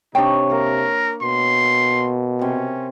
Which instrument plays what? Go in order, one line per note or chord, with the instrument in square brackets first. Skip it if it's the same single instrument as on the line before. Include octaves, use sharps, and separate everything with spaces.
[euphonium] C3 [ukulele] D4 G5 [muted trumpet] D#4 [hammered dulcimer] C#5
[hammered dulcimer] A#3 [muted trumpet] A#4
[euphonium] B2 [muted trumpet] C6
[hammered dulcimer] C3 [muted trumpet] C#4